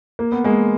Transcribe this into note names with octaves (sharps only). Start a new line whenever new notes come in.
A#3
B3
G#3 A#3